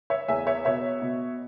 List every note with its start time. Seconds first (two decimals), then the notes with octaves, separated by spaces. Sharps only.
0.10 C#5 E5
0.28 E2 E5 G#5
0.47 C#5 E5
0.65 B2 C#5 E5
1.02 B2